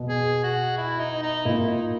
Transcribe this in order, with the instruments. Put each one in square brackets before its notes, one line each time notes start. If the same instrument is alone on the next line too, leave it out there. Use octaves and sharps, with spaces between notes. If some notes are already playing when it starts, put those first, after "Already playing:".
Already playing: [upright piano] B2
[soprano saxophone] G#4
F#4
E4
D#4
D#4
[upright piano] A#2 [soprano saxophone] E4
[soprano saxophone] D#4